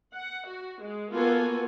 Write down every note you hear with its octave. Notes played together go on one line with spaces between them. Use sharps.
F#5
F#4
G#3
A#3 B3 F4 F#4 A4 G#5